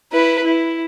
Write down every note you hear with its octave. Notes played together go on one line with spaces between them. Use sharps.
E4 B4
E4